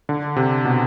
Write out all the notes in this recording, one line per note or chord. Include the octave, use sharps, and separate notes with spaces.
D3
C3
B2